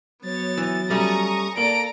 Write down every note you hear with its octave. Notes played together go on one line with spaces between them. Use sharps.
F#3 B3 C#5 A6
E3
G3 A3 C#4 A#5 C#6 D#6
A#3 A4 D5 A#5 D7